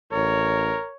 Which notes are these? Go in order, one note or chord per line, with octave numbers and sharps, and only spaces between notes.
A1 A#4 C#5